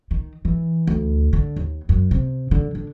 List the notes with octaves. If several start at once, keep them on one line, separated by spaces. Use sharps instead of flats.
D#3
E3
D2
D3
D#2
F#2
C3
D3
D3